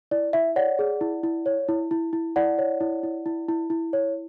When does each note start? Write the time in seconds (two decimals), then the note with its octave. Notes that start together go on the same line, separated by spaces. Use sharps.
0.11 E4 D5
0.33 E4 E5
0.56 C#5 D5 F#5
0.79 G#4
1.01 E4
1.23 E4
1.46 C#5
1.69 E4
1.91 E4
2.13 E4
2.36 E4 D5 F#5
2.58 C#5
2.81 E4
3.03 E4
3.26 E4
3.49 E4
3.70 E4
3.93 C#5